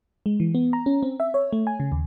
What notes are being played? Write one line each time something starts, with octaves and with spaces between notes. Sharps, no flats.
G#3
E3
B3
A#5
C#4
C4
E5
C#5
A3
G#5
C#3
D#2